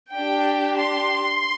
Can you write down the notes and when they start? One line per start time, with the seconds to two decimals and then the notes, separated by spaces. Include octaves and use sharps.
0.14 D4 G4 G5
0.80 C6